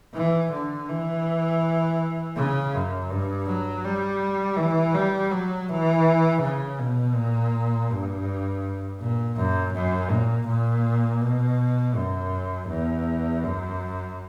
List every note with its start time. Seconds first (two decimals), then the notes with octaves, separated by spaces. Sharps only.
0.15 E3
0.52 D3
0.89 E3
2.37 C#3
2.74 F#2
3.11 G2
3.47 F#3
3.85 G3
4.58 E3
4.95 G3
5.32 F#3
5.69 E3
6.42 C#3
6.80 B2
7.16 A#2
7.90 G2
9.00 A#2
9.37 F#2
9.74 F#2
10.11 A#2
10.48 A#2
11.22 B2
11.96 F#2
12.69 E2
13.44 F#2